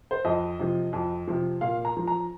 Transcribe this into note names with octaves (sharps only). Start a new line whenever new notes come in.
C5
F2 D#5
C3 F3
F2
C3 F3
A#2 F5
A#5
F3
A#5